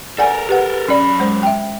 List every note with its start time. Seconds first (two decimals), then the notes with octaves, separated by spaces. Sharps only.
0.18 A4 A#4 D5 F#5 G#5
0.49 G4 B4 F#5
0.88 F#2 C#4 D5 B5
1.20 G#3 C5
1.43 E5 G5